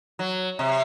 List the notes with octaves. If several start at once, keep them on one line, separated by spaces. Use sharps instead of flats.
F#3
C3